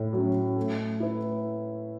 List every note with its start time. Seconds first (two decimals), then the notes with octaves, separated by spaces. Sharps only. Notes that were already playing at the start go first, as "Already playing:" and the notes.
Already playing: A2
0.13 F#3 C#4
0.56 A3
1.00 E4 B4